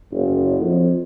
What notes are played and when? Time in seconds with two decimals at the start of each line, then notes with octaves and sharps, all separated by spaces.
0.12 F#1
0.61 F2